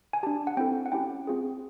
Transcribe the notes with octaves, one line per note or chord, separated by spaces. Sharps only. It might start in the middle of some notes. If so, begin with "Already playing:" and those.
G#5
D4 G4 A5
F#5
C4 E4 A4 G5
F#5
C#4 E4 G4 G5
C4 F4 G#4